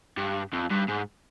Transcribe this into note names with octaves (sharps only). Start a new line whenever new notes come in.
G2
F2
G2
G#2